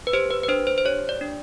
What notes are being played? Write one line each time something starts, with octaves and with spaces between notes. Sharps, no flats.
B4
G4 C5
B4
B4
D4 C5
C5
C5
G4 C#5
D5
D4